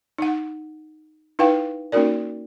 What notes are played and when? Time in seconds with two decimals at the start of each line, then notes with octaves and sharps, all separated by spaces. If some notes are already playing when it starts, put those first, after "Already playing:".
0.18 D#4 F#5
1.39 D#4 E4 B4 F5 G5
1.92 A#3 C#4 D#4 F#4 A#4 D5